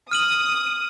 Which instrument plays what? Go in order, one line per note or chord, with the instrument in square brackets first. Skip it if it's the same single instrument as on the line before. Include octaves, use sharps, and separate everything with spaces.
[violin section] D#6 [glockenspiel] F6 D#7 F#7